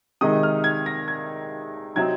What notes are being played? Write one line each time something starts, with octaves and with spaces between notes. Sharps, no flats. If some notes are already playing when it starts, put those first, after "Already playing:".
C3 D#3 G#3 D#4 D#6
F6
G#6
A#6
G#6
C3 F#3 C4 D#4 G#6